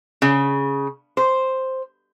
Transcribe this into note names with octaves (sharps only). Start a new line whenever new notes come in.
C#3
C5